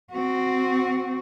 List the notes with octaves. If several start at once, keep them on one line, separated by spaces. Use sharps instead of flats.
C4 F#4